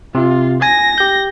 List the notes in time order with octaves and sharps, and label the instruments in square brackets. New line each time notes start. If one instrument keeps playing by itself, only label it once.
[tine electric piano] C3 [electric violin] F4
[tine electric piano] G#5 [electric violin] A#6
[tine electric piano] G4 G6